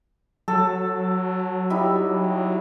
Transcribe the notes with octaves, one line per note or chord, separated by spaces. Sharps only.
F#3 A4
G3 D#4 E4